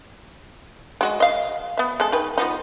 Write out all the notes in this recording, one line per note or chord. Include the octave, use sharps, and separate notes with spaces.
G#3 F#4 D#5
D#5 F5
B3 E5
G#3 A4
D#3 B4
F3 B3 D#4